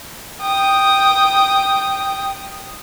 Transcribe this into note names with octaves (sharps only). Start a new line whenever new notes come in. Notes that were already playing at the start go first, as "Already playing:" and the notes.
G5 D#6